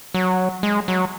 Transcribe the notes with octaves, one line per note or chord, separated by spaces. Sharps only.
F#3
G#3
F#3